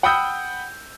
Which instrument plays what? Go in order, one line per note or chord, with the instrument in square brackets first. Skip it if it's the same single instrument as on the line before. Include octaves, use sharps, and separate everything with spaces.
[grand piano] F#5 G5 B5 D#6 E6 G6